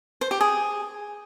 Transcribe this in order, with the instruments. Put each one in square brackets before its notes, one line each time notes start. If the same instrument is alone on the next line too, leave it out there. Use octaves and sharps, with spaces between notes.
[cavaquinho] C5
G4
G#4